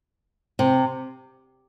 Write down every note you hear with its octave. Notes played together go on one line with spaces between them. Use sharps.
C3